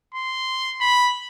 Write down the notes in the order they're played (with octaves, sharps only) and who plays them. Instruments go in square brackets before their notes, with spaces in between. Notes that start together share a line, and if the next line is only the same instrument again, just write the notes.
[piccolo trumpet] C6
B5